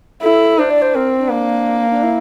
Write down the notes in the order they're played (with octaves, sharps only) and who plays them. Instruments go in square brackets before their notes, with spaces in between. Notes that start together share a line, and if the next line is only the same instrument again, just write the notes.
[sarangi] E4 [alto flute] A4
[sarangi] D4 [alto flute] C5
[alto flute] D5
C5
[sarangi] C4 [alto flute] A#4
[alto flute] D4
[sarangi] A#3
[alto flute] D4
E4